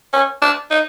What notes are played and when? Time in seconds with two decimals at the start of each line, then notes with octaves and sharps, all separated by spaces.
0.13 C#4
0.42 D4
0.71 D#4